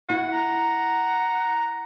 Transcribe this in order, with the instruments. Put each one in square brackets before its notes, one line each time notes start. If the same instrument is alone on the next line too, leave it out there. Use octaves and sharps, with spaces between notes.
[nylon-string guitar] E4 [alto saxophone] F#5
[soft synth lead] A#5